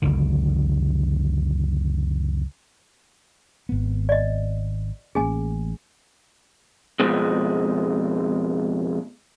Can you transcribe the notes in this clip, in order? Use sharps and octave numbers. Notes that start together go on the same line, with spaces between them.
F#1 C#2 D3 D#3
G#1 B3
D5 D#5
A1 A#3 C#4 G#4 G#5
F2 B2 G#3